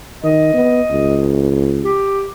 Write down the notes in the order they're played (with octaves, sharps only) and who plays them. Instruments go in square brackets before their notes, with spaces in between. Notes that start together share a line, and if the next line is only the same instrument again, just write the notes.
[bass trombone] D#3 [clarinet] D#5
[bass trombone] B3
C#2
[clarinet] G4